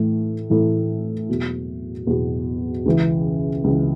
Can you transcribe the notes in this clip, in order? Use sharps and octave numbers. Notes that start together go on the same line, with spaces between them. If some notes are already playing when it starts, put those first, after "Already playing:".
Already playing: A2 E3 A3 E4 A4
A2 E3 A3 E4 A4
E2 B2 F#3
E2 B2 F#3
C#2 C#3 E3
C#2 C#3 E3